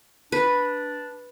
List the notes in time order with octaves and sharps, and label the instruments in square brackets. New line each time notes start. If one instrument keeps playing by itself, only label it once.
[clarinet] D4 [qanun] B4